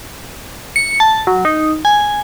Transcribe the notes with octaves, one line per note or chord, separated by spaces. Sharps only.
C#7
A5
F#3
D#4
G#5